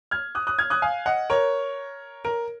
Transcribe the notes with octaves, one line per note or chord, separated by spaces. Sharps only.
F6 G#6
D#6 F#6
D#6 F#6
F6 G#6
D#6 F#6
F5 G#5
D#5 F#5
A#4 C#5
A#4